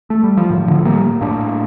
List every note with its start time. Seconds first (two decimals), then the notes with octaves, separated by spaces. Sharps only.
0.10 A3
0.24 G3
0.37 F3
0.49 A2 D#3
0.67 D3 F3
0.85 G3 A#3
1.21 A2 A#3 D4